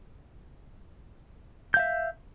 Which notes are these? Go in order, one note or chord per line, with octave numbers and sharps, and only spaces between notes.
E5 F5 G6